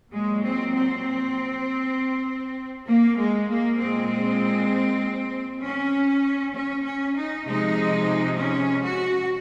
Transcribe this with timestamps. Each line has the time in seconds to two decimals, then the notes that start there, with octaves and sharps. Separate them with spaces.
0.12 A#2 F#3 G#3
0.43 C4
0.74 C4
2.87 A#3
3.17 G#3
3.48 A#3
3.79 A#2 G#3 C4
5.62 C#4
6.54 C#4
6.85 C#4
7.15 D#4
7.46 C3 F3 G#3 D#4
8.38 C#4
8.83 F#4